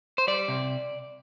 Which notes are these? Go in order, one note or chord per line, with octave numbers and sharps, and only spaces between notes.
C5
G3 D5
C3